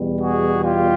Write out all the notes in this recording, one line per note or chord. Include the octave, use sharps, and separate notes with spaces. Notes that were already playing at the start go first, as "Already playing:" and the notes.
Already playing: E2 B2 G3
F#4 G#4
F4 G4